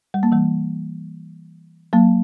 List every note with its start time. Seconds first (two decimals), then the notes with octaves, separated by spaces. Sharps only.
0.14 G3
0.23 A#3
0.32 E3 G3
1.93 F#3 A#3